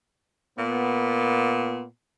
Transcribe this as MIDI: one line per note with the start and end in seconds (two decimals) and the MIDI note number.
0.58 1.87 46
0.58 1.84 59